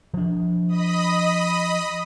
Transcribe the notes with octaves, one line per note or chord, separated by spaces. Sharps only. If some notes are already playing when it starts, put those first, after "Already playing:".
F3 D4
D#5 B5 D#6